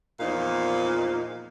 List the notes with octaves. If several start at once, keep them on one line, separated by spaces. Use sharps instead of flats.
E2 A#2 F3 D#4 F5